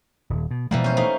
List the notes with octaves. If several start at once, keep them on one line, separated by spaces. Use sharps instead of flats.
D#1
B2
B2 E3 F3 G3 G#3 A#3
C#4 C5
A3 A#3 D#4